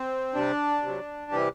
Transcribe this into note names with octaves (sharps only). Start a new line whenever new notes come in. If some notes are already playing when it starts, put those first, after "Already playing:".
Already playing: C4
C3 G3 D4
C3
F#3
C3 E3 G3 G4